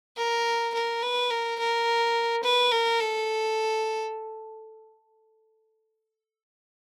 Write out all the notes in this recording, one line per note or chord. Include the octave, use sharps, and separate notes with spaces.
A#4
A#4
B4
A#4
A#4
B4
A#4
A4